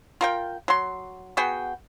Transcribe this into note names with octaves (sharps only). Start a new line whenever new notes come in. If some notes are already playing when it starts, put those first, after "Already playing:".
F4 A#4 G5
F#3 C6
B3 F#4 G#4 G5